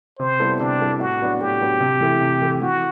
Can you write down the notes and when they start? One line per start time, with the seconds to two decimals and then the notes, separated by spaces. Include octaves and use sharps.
0.19 C3 C5
0.40 G3 B3 E4 A4
0.60 C3 D4
0.80 G3 B3 E4 A4
1.00 A2 F#4
1.20 F#3 B3 D4
1.41 A2 G4
1.61 F#3 B3 D4
1.80 C3
2.01 E3 A3 E4
2.21 C3
2.42 E3 A3 E4
2.61 E3 F#4